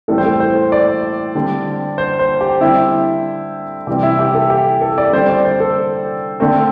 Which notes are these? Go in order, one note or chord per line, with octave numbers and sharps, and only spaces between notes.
A2 E3 G3 C4 A4
C5
A4
C5
D5
D3 G3 C4
C5
C5
G4
D3 G3 C4 E4
C3 E3 G3 C4 G4
E4
G4
A4
G4
A4
D5
D3 G3 C4 C5
D5
C5
A4
D3 A3 C4